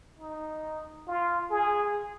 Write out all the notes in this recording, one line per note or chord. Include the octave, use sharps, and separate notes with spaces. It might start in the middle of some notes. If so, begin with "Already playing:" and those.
D#4
F4
G#4